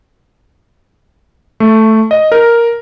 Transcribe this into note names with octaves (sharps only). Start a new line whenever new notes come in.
A3
D#5
A#4